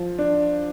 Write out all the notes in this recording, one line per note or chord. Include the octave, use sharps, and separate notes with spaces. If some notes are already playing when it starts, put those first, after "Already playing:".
Already playing: F3
D4